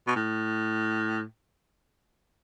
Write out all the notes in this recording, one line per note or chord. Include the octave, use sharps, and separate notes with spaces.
B2
A2